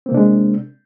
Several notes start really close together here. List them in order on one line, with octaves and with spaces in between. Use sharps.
C4 A#3 C3 D4 G#3